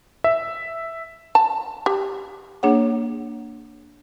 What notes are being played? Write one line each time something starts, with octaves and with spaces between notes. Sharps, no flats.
E5
A5
G4
A#3 D4 G#4 C#5 F#5